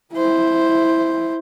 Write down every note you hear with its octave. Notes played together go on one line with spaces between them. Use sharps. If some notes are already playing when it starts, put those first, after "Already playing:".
E4 C5